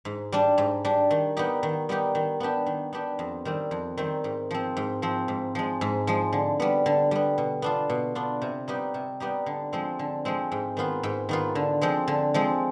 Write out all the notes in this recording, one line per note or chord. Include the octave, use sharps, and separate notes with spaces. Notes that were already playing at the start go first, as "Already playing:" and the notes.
G#2
G3 D4
G#2
G3 D4
D#3
G3 B3 D#4 G4
D#3
G3 B3 D#4 G4
D#3
B3 D4 G4
D#3
B3 D4 G4
F2
D#3 G3 C4
F2
D#3 G3 C4
G#2
F3 C4
G#2
F3 C4
G#2
F3 G#3
G#2
F3 G#3
D3
G3 B3
D3
G3 B3
B2
B3 D4 F4
B2
B3 D4 F4
C3
G3 B3 D#4 G4
C3
G3 B3 D#4 G4
D3
F3 G#3 C4
D3
F3 G#3 C4
G#2
D#3 B3 F4
G#2
D#3 B3 F4
D3
F3 G#3 C4
D3
F3 G#3 C4